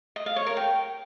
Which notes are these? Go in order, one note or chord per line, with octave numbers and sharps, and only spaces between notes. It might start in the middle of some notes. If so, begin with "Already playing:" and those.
D#5
F5
C#5
A#4
G5